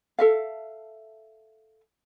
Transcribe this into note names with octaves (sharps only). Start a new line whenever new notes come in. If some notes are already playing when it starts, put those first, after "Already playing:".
A4 E5 F5